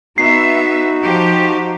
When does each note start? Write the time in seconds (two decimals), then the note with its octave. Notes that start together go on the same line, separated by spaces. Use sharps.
0.18 B3 D#4 F#4 E5 C7
1.01 F3 G4